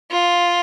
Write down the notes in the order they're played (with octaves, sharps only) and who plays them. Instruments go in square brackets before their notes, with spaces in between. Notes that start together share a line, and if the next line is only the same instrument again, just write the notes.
[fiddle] F4